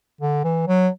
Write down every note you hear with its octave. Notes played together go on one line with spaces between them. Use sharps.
D3
E3
F#3